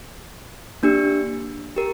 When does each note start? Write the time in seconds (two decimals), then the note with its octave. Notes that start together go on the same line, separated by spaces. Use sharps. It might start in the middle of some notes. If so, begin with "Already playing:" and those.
0.83 A#3 D4 G4
1.76 G4 A#4